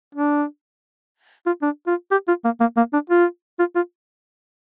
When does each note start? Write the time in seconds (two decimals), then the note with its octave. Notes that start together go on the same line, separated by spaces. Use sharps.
0.15 D4
1.46 F4
1.62 D4
1.87 F4
2.11 G4
2.28 F4
2.44 A#3
2.60 A#3
2.77 A#3
2.93 D4
3.10 F4
3.59 F4
3.76 F4